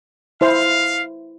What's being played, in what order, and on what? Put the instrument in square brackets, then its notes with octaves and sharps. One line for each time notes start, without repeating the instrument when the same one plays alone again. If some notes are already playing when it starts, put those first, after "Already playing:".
[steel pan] E4 C5 [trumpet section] F5